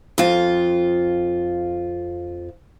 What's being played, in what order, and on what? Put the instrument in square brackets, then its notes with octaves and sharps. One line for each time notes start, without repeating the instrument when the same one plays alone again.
[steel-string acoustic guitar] F2 F4